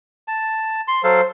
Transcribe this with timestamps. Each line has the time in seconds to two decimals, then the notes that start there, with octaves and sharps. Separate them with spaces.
0.28 A5
0.88 C6
1.04 F#3 A4 C5 F5